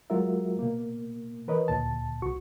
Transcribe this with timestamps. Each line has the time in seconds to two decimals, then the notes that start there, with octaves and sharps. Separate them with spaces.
0.10 F#3 G#3 F4 F#4 A#4 E5
0.59 B2 A#3
1.48 E3 A#4 B4 C#5 D#5
1.68 D2 A#2 A5
2.22 C2 F#4 C#6